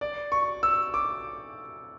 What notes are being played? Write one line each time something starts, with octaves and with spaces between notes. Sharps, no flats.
D5
C#6
E6
D6